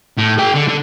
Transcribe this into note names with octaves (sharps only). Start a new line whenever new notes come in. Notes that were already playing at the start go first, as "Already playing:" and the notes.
A2
G#4 G5
D3
D3